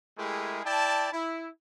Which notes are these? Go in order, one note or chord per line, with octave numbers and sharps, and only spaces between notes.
G#3 A3 E4 G4 G#4 A#4
E4 D5 G5 A5
E4